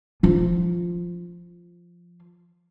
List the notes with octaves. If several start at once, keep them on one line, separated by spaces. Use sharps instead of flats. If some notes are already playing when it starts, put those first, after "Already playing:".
F3 F4